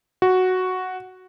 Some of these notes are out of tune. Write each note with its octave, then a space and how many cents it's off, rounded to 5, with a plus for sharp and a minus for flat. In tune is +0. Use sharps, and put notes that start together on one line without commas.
F#4 +0